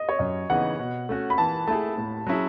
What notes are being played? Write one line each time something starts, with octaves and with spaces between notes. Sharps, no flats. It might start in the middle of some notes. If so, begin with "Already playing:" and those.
Already playing: D#5
C#5
F#2 D#5
C#3 E3 B3 D#4 F#5
B2
A3 C#4 F#4
B5
E3 A5
A3 E4 G#4 A5
A2
F#3 C#4 E4 G#4